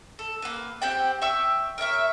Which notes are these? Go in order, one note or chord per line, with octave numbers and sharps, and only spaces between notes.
A4
A#3 B4
C4 G4 F#5 G5
E5 G5 C#6 E6
A#4 C#5 E5 C#6